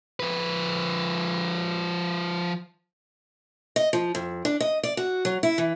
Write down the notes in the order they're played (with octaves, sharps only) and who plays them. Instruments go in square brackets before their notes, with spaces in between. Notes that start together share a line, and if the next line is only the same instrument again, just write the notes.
[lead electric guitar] F3 B4
[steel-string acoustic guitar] D#5
F3
F2
D4
D#5
D5
F#4
F#3
E4
E3